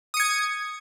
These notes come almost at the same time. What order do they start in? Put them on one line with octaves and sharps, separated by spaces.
D#6 C#7 G#6